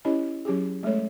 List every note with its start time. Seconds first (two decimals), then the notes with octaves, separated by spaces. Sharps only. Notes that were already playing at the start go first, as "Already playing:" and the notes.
0.05 C#4 E4 G4 C#5 D#5
0.45 F#3 C#4 G4 G#4
0.83 G#3 A3 A4 C#5